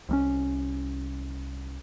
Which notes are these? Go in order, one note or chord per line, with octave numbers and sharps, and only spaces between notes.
C2 G3 C#4